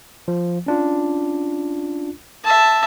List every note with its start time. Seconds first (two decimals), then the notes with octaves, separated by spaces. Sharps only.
0.28 F3
0.66 C#4 D4 F4
2.44 E5 A5